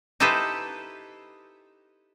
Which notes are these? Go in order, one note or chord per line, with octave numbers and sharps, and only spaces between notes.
D#4 E4 G4 A4 B4 C5